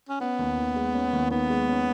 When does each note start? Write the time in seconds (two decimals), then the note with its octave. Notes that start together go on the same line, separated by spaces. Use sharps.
0.09 C#4
0.20 B3 C#4
0.39 D#2
0.57 D#3
0.76 G#3
0.94 C#4
1.13 D#2
1.31 D#3 B3
1.50 G#3
1.68 C#4